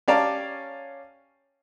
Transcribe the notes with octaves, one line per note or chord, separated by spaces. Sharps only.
C#4 G4 D5 F5 A5 A#5